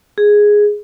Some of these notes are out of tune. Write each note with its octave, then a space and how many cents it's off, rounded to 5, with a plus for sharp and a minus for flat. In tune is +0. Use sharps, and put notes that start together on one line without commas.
G#4 +0